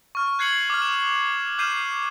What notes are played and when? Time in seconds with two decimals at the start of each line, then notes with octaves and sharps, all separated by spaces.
0.15 C#6 F6
0.39 F#6 G#6 C7 C#7 F#7
0.70 D6 F6
0.82 E7
1.58 D6 F6 G6 C7 D#7 E7